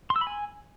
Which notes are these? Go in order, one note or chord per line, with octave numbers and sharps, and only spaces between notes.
C6
E6
B5
G#5